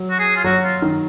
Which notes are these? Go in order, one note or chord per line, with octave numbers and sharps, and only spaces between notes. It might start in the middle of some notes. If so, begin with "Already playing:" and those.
Already playing: F#3
F#4
G#4
F4
F#3 F#4
F4
D#3